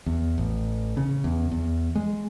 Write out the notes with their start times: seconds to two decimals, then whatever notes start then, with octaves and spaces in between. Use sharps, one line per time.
0.06 E2
0.38 A1
0.97 C#3
1.24 E2
1.52 E2
1.95 G#3